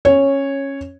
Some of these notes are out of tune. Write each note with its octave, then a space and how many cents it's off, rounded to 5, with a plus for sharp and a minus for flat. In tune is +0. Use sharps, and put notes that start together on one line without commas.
C#4 -15 C#5 -5